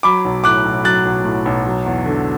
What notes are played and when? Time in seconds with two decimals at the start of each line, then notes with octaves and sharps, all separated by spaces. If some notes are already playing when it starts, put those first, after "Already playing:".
0.03 F#3 B5 D6
0.25 B1
0.44 A2 D6 F#6
0.65 B1
0.84 F#3 F#6 A6
1.05 B1
1.24 A2
1.46 B1
1.65 F#3
1.86 E2
2.05 D3